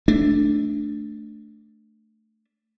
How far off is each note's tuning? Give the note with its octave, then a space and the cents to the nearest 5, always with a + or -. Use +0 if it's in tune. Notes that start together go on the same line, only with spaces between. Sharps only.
A3 +0 D4 +0